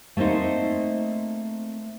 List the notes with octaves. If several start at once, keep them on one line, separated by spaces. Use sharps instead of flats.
A3 A#3 C4 D#4 C5